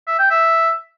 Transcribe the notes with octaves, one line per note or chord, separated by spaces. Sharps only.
E5
G5
E5